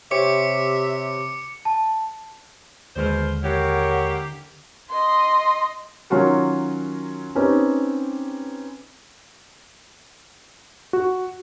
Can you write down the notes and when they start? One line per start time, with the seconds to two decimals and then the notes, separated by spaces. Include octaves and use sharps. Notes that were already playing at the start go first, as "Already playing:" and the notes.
0.11 C3 G4 C5 C#5 E5 D6 C#7
1.65 A5
2.96 D#2 B2 D3 G#3 C5 F6
3.43 A#3 E4 G4 A#4 C#5 F#5
4.90 D#5 C6
6.10 D#3 F#3 C#4 F4 F#4 A#4
7.35 C4 C#4 D#4 G4 B4
10.93 F#4